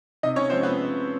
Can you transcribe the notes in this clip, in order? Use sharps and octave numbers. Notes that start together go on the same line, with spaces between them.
C3 D#4 D#5
C#4 C#5
F3 G#3 C4 C5
B3 B4